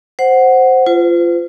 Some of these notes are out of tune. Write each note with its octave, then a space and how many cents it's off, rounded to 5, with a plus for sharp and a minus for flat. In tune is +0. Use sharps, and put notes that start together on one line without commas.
C5 +0 F#5 +0
F4 -20 C5 -45